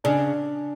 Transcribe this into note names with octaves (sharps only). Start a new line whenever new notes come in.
C#3 D4